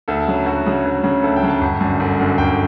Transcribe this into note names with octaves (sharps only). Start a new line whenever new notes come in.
D2 A4
C#3 F#3
D2 F#4
C#3 F#3
D2
C#3 F#3
D2 A4
G5
C#3 F#3
A5
G1
F#2 D3
G1
F#2 D3
G1 G5